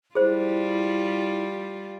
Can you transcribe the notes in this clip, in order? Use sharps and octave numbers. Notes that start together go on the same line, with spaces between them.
G3 E4 F4 G#4 C5